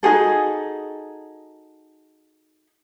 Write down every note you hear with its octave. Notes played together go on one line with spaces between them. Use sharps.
D#4 F#4 G#4 A4